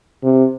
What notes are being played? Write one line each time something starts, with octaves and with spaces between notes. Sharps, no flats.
C3